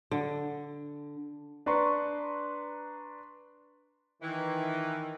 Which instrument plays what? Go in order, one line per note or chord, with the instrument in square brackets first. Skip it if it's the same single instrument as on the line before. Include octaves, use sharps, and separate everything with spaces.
[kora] D3
[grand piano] D4 B4 A#5 C6 C#6
[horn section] D#3 E3